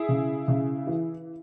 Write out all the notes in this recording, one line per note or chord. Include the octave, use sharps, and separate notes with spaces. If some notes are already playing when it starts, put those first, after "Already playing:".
Already playing: E4 G#4
C#3
C#3
E3